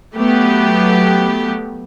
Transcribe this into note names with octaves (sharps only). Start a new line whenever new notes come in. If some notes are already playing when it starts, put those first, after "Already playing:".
F#3 A3 B3 G4